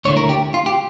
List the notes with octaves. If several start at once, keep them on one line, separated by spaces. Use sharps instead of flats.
D2 D3 A3 E4 C#5
A#4
G4
F4
G4